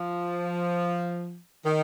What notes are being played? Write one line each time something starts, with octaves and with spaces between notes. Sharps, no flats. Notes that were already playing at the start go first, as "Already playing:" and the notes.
Already playing: F3
D#3